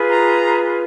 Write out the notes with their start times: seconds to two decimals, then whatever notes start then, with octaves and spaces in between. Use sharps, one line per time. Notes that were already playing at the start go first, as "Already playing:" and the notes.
Already playing: F4 G#4 B4
0.10 A#5